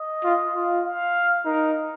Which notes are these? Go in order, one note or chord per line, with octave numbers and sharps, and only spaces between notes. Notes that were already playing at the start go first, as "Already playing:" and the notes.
Already playing: D#5
F4
F4
F5
D#4 A#4